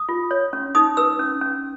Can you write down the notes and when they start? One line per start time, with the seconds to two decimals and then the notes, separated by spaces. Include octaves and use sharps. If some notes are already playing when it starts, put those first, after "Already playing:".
Already playing: D#6
0.09 F4
0.31 C#5
0.53 C#4
0.75 D#4 D#6
0.97 B4 E6
1.19 C#4
1.41 C#4